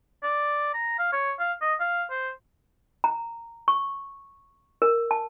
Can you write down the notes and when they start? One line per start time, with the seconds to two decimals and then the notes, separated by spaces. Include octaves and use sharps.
0.23 D5
0.73 A#5
0.99 F5
1.12 C#5
1.39 F5
1.61 D#5
1.80 F5
2.10 C5
3.04 A#5
3.68 C#6
4.82 A#4
5.11 A5